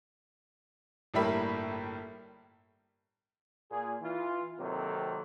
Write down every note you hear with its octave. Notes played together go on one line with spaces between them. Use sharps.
G1 A2 G3 A#3 E5 B5
A#2 G#4
E3 F4
C3 D#3 F#3 A#3 C4 A4